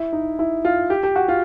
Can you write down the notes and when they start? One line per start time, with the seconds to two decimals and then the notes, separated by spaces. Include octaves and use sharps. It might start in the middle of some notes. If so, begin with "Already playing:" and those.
Already playing: E4
0.13 D#4
0.39 E4
0.65 F4
0.90 G4
1.03 G4
1.16 F#4
1.28 F4